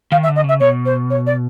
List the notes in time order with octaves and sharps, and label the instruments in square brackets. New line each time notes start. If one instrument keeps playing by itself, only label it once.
[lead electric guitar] D#3 [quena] F5
[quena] E5
[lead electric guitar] D3
[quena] D#5
[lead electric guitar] C#3 [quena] E5
[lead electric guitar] B2 [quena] C#5
[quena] C5
C#5
D5